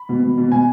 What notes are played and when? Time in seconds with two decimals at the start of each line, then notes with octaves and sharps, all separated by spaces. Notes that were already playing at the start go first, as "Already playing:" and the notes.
Already playing: B5
0.09 B2
0.23 B2
0.38 B2
0.52 B2 G#5